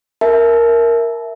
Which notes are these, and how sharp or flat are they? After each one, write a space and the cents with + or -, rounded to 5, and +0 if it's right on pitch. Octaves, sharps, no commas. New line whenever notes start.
A#4 +0 E5 +0 A5 -35